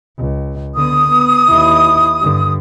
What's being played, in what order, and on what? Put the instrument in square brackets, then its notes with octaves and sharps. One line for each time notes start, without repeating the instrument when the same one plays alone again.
[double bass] C#2
[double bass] D3 B3 [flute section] D#6
[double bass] B3
D#2 E4
G2 D3